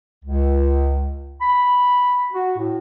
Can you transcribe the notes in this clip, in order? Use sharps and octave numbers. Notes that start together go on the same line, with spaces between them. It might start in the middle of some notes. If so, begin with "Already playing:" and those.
C#2
B5
F#4
A2